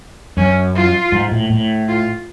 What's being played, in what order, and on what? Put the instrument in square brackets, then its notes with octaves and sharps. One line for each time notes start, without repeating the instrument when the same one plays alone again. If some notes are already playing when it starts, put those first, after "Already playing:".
[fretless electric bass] F#2 [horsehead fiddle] C#4
[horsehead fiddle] F4
[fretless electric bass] G#2
A2
A2
[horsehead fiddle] F4